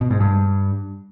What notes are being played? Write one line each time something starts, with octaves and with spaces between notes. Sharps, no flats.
B2
G#2
G2